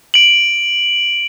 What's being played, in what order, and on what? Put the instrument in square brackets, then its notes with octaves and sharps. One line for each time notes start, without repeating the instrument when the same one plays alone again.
[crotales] D7 F#7